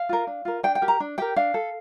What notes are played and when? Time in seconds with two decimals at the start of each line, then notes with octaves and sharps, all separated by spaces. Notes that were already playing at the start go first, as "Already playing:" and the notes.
Already playing: F5
0.09 F4 A#4
0.27 D4
0.45 F4 A#4
0.63 D4 G5
0.75 G5
0.82 G4 A#4
0.88 A#5
1.00 D4
1.18 G4 A#4 G5
1.36 D4 F5
1.54 A4